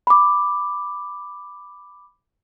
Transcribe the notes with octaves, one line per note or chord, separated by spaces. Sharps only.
B5 D6